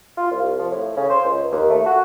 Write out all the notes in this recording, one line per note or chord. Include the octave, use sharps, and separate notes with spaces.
F4
C2
F3
A2
C#3
C5
C#2
D#2
A3
F#4